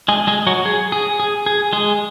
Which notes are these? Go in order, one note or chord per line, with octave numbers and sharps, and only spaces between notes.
G#3 G#4
G#3 G#4
F#3 F#4
G#4
G#4
G#4
G#4
G#3 G#4